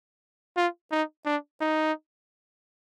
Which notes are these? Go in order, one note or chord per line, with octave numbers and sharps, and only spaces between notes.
F4
D#4
D4
D#4